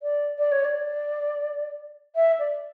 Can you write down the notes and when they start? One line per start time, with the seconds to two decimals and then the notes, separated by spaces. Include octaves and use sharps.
0.03 D5
0.38 D5
0.52 C#5
0.65 D5
2.16 E5
2.39 D5